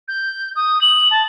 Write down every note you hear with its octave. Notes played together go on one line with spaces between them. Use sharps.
G6
D#6
F#7
A5